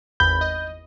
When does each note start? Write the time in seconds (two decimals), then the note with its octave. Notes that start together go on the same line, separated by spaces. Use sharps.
0.20 G#1 E2 B5 G6
0.41 D#5